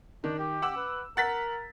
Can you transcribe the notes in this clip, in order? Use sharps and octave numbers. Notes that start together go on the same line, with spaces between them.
D#3 D4
G4
F#5 D6 E6
B4
A#4 F#5 A6 B6